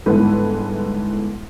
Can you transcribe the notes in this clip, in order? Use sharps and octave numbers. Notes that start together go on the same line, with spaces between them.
G1 G#2 E3 B3 A4 B4